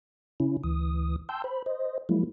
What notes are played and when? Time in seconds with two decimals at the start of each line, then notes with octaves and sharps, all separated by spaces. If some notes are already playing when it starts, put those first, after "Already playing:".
0.40 C#3 C#4 E4
0.64 D2 E3 D#6
1.29 G5 A5 C6 E6 G6
1.44 C5 B5
1.66 C5 D#5
2.09 F3 F#3 G#3 A#3 E4